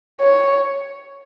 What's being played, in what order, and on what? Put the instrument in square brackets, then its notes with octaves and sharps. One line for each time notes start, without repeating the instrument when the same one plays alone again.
[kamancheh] C#5